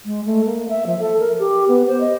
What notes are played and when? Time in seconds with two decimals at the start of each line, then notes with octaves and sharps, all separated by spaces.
0.05 G#3
0.26 A3
0.45 A#3
0.69 E5
0.86 F3
1.00 A4
1.20 A#4
1.39 G4
1.68 B3
1.87 C5
2.00 D#5